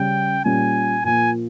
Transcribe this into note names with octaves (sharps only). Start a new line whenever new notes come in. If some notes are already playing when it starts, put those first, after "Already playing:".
Already playing: C#3 G3 C#4 G5
A#2 G3 C#4 G#5
A#2 F3 A#3 G#5